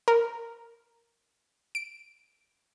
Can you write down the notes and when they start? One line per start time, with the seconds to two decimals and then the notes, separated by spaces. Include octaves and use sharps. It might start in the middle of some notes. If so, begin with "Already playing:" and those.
0.08 A#4
1.75 D7